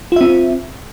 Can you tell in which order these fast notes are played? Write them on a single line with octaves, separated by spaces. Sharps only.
F4 E5 C4